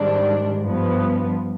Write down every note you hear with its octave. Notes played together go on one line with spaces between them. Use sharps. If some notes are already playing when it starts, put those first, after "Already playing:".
Already playing: G#2 D#3 G3 D4
G2 F3 B3